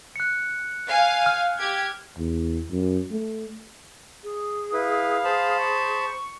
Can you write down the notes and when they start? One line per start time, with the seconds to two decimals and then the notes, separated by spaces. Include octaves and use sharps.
0.16 F#6 C#7
0.88 F5 G#5
1.26 F6
1.59 G4 G#6
2.18 E2
2.71 F#2
3.11 A3
4.24 G#4
4.73 E4 B4 F5
5.24 C5 A5 B5
5.60 C#6